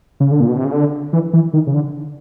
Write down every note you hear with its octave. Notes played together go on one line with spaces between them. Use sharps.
C#3
D3
A#2
B2
C3
C#3
D3
E3
E3
D#3
C#3
D3